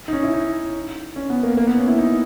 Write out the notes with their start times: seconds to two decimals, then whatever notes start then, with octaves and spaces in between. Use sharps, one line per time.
0.08 D#4
0.13 C#4
0.23 E4
0.34 D#4
1.16 C#4
1.30 B3
1.43 A#3
1.57 A#3
1.67 B3
1.77 C#4
1.88 E4
1.98 D#4